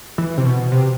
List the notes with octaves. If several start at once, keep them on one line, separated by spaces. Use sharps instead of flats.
E3
C3
B2
C3